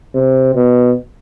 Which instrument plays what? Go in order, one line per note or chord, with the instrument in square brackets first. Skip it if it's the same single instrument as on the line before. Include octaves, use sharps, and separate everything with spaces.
[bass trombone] C3
B2